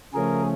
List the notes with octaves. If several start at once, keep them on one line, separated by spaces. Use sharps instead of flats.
C#3 F3 A3 C#4 G#4 A#4